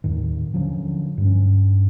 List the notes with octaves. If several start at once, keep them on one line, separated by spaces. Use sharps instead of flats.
D#2 A2 D#3
D3 F3 F#3 C#4
G2 C#4